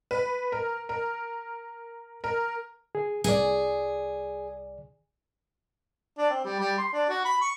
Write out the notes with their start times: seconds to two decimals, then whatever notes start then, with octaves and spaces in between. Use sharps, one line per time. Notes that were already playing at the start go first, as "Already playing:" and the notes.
0.11 B4
0.52 A#4
0.89 A#4
2.24 A#4
2.95 G#4
3.24 C2 G#4 D5
6.18 D4
6.30 C4
6.45 G3
6.59 G3
6.78 C6
6.93 D4
7.09 F#4
7.25 B5
7.41 C#6